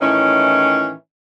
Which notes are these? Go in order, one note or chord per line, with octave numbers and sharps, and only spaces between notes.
A2 D#3 E3 C#4